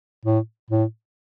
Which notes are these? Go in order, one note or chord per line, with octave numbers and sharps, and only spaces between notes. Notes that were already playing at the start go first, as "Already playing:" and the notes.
A2
A2